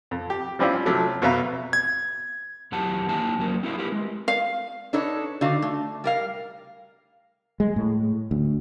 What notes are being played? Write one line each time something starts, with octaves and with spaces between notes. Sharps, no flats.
F2
G4
F3 G3 C4 C#4 E4 F4
C3 F3 F#3 A3
F2 B2 B4 E5 F5 A#5
G#6
E2 E3 F#3 G4 F#5 A5
A#3 D#4 E5 G#5 A5
F2 F#3 A#3
C4 E4 F#4 E5 F5
E4 G4 A#4 B4
G#3
F5
D4 D#4 A4 B4 C#5
D3 D#4 F#4 F5
A3
G3 A#4 F5
G#3
A2
D2